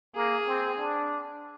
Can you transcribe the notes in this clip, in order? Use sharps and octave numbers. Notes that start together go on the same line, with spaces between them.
A#3 G#4
C4
D4